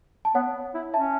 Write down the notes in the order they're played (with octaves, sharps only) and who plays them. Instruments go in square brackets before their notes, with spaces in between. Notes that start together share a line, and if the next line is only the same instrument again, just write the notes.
[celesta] A5
[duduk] B3 [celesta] C#5 F#5
[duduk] E4
[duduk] C#4 [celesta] E5 A5